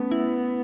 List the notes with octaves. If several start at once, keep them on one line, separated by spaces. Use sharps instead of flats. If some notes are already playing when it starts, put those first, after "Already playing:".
Already playing: A3 B3 C#4
E4